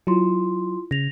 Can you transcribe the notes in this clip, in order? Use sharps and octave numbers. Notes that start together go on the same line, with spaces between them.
F#3 E4 F4 C6
C#3 A#6 F7